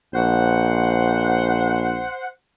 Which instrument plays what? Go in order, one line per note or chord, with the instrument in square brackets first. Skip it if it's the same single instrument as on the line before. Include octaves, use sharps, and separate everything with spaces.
[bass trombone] A#1 [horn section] C5 F#5